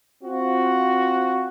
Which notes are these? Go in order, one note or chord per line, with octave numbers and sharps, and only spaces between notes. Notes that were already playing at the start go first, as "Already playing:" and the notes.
C4 F4 F#4